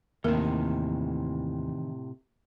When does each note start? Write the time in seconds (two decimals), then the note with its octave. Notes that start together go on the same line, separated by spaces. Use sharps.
0.24 D#2 A2 C3 D#3 E3 A#3 B3 A#4